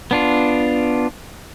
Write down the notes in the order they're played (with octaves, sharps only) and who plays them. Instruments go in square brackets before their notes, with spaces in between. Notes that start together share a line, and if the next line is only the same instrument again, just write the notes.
[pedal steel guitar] B3 D4 F4